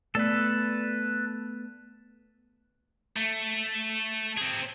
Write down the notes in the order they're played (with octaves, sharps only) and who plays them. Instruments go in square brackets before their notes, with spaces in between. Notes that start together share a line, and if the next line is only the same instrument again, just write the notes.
[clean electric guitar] A3 B3 D5 [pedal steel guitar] A4 B4
[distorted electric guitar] A3
C4 G#4